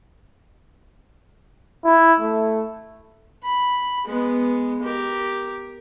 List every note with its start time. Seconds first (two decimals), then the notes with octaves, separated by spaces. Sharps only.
1.85 E4
2.21 A3
3.43 B5
4.05 G#3 B3
4.82 G4 A#4